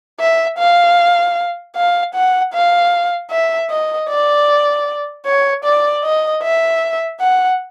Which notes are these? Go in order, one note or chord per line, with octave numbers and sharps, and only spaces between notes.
E5
F5
F5
F#5
F5
E5
D#5
D5
C#5
D5
D#5
E5
F#5